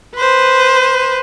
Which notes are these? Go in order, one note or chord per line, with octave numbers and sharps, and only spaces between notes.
B4 C5